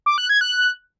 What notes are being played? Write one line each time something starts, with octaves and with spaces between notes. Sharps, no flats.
D6
F#6
G#6
F#6